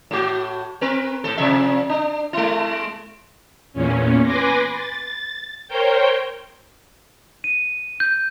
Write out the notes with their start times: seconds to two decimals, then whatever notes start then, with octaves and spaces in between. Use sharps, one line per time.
0.11 A2 F#4
0.81 C4 A#4 B4
1.24 A2 A4
1.38 C3 F3 E5
1.89 D4
2.33 G#3 E4
3.73 E2 A#2 C#4
4.23 B4 G#5 C6 D6 A#6
4.74 A6
5.68 A#4 C5 C#5 G5 G6
7.44 D#7
8.00 G6